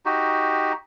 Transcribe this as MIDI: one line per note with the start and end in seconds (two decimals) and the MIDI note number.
0.06 0.72 63
0.06 0.72 66
0.06 0.72 67